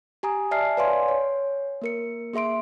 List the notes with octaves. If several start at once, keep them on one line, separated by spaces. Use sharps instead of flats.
G4 G#5 A#5 D#6
D5 E5 G#5 A5 F6 C7
B4 C#5 D5 F5 G#5 C6
C#5
A#3 A#4 C#7
A#3 G#4 E5 C6 D7